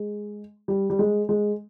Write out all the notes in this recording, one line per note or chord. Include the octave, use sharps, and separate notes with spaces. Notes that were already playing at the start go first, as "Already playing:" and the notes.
Already playing: G#3
G3
G3
G#3
G#3